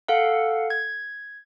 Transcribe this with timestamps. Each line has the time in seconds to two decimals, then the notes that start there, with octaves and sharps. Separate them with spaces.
0.08 A4 F5 F#5
0.70 G#6